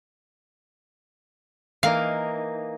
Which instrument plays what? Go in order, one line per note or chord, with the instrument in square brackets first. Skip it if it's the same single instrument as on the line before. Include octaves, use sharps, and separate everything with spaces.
[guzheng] E3 A#3 D#4 [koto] F5